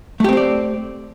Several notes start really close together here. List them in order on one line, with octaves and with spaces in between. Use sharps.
A3 G4 C4 C5 D5